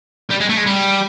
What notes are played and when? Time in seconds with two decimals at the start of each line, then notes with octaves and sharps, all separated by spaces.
0.31 G3
0.40 G#3
0.49 A3
0.57 G#3
0.66 G3